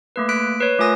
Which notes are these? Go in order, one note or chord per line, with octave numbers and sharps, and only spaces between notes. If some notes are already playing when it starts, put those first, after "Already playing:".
A3 A#3 B4
A#3 F#6 B6 D7
B4 C#5
A3 F4 A#4 G#5 D#6 A#6